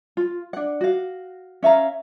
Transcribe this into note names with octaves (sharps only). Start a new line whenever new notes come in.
F4
D4 F#5
F#4 F5
C#4 E5 F5 A#5